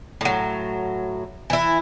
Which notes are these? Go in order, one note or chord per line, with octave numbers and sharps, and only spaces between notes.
A2 F#3
E3 E4